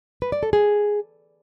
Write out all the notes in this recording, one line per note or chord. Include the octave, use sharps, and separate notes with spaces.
B4
D5
A4
G#4